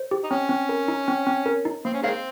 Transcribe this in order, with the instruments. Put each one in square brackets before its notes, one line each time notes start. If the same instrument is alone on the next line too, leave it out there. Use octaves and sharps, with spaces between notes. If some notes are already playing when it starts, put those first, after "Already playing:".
Already playing: [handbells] C5
G4
[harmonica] D#4
[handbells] C4 [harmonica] C#4
[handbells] C4
A#4
D#4
C4
C4
A#4
D#4
[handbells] A#3 [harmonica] C4
[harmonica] C#4
[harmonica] D#3 G#3 C4 [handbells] F5